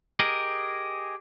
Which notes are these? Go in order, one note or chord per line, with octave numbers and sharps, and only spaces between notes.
G4 G#4 A#4 D#5